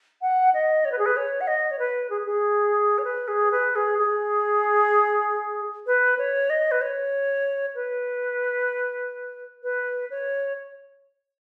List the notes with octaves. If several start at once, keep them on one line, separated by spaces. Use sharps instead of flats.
F#5
D#5
C#5
B4
G#4
B4
C#5
F#5
D#5
C#5
B4
G#4
G#4
C#5
B4
G#4
B4
G#4
G#4
B4
C#5
D#5
B4
C#5
B4
B4
C#5